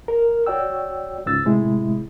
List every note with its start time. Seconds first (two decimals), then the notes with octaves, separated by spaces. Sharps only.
0.08 A#4
0.46 F#4 C#5 D5 G5 E6
1.26 C#2 G#2 C#3 E6 A6
1.45 A2 C3 G#3 E4